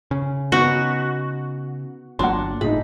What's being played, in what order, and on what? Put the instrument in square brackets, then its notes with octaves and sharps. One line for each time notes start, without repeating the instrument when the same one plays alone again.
[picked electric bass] C#3
[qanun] B3 D#4 B4 [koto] F#4
[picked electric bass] G1 F#3 A#3 [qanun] D4 [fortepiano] F#5 C6
[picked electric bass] G1 A2 [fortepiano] D#4 G#4 [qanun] B5